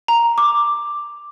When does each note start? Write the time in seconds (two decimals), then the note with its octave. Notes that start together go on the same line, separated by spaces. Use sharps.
0.08 A#5
0.38 D6